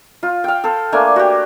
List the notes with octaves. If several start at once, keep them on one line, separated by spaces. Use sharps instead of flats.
F4
F5 G5
A4 C5
A3 A#3 D4 G#5
F#4 G4